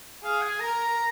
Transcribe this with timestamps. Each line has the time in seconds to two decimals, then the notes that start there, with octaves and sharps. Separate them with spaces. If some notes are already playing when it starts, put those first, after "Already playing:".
0.24 G#4 F5
0.42 G#5
0.60 A#4 A#5